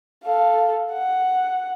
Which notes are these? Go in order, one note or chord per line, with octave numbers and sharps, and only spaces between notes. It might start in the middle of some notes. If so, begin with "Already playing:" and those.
A4 F5
F#5